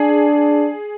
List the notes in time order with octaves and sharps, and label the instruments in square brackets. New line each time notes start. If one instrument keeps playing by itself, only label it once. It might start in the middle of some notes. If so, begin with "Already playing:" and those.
Already playing: [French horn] D4 [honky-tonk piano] G#4